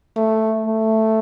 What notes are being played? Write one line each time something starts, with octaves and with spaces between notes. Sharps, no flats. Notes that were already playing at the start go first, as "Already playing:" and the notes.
A3
A3